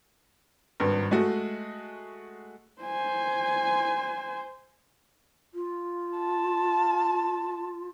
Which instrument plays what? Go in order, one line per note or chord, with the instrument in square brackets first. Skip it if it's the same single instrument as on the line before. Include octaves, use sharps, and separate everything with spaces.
[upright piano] G#1 G2
G#3 A3 F#4
[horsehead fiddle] C5 G#5
[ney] F4
[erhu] A5